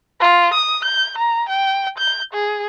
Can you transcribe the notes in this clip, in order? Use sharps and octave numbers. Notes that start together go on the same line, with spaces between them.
F4
D#6
G6
A#5
G5
G6
G#4